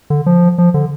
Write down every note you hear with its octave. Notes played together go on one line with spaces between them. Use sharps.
D3
F3
F3
D3